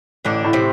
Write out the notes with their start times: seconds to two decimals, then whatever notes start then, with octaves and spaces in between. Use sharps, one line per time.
0.25 A1 D3 D4
0.44 A2
0.53 C3 C4